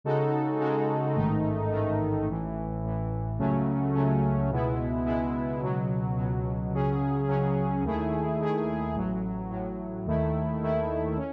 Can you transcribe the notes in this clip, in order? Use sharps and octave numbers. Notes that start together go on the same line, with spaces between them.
C#3 G#3 D#4 F#4 A4
C#3 G#3 D#4 F#4 A4
A1 G#2 D#3 A3 D#4
A1 G#2 D#3 A3 D#4
A1 A2 E3
A1 A2 E3
C#2 C#3 F#3 A3 C#4
C#2 C#3 F#3 A3 C#4
C#2 B2 G#3 B3 E4
C#2 B2 G#3 B3 E4
C#2 B2 F#3
C#2 B2 F#3
C#2 C#3 F#3 C#4 G#4
C#2 C#3 F#3 C#4 G#4
D#2 D#3 A3 E4 G#4
D#2 D#3 A3 E4 G#4
A1 A2 F#3
A1 A2 F#3
D#2 D#3 A3 E4
D#2 D#3 A3 E4
C#4